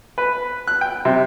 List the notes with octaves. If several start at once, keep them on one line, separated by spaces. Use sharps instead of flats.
B4
F#6
G5
C3